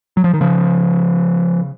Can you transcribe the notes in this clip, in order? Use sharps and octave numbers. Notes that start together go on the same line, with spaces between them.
F#3
F3
D#3
C#3 F3